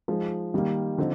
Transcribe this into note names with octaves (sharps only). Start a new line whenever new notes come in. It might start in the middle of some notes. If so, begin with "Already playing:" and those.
F3 G#3 D#4 G#4
D#3 G3 A#3
D3 F3 C4 D#4